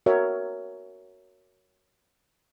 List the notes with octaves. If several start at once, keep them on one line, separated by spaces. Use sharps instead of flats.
F#4 A#4 C#5 E5